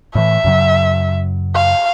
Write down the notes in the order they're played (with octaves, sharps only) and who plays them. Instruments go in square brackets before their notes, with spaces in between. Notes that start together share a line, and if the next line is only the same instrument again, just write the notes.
[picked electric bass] A2 E3 [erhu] E5
[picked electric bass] F#2 C#3 F#3
[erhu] F5